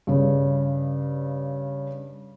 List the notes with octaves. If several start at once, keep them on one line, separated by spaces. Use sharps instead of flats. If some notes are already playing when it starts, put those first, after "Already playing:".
G2 C#3